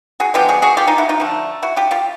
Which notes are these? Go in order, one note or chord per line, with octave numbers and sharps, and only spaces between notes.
F#4 G#4
D3 F3 G#3 B3 F4 G4
F#4 G#4
F#4 G#4
F4 G4
D#4 F4
E4 F#4
D#4 F4
D3 F3 A3
E4 F#4
F4 G4
F4 G4